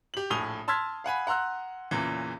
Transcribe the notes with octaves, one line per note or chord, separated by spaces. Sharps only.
G4 F#7
A#1 A2 G#5 D#6 F7 G7
A5 C6 E6 F6 G#6 B6
F5 F#5 G#5 B5
F#5 A#5 C6 E6 F#6
E2 A#2 C#3 E3